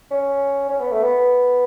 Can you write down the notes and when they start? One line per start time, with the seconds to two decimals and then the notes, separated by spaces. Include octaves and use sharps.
0.11 C#4
0.69 C#4
0.80 B3
0.91 A3
1.03 B3